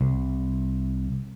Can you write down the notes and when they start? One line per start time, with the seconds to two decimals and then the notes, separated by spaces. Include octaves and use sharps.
0.01 C2